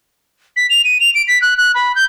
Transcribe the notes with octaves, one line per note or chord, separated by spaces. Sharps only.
B6
F7
D#7
F7
D7
B6
F#6
F#6
B5
G6